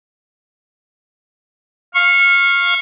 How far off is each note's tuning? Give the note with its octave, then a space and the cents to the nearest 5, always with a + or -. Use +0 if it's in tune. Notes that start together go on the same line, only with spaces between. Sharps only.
F5 +0 C#6 -20